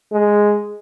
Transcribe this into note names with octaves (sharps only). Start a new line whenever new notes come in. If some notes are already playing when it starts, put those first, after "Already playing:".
G#3